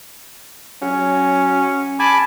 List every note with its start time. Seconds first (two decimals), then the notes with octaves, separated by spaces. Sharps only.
0.82 F#3 C#4
2.00 G#5 A5 B5 D6